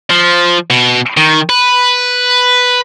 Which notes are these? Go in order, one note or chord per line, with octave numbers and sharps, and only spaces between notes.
F3
B2
D#3
B4